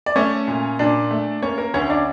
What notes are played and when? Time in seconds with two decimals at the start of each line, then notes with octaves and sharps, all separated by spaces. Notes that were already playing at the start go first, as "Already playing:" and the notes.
0.06 D5
0.16 A3 C#4 C#5
0.48 A#2
0.79 A#2 D4 D5
1.11 A3
1.42 A#3 C#4 C#5
1.58 A#3 A#4
1.74 D2 C#4 C#5
1.90 D4 D5